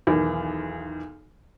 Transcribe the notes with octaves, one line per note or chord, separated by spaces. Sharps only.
B1 E2 D#3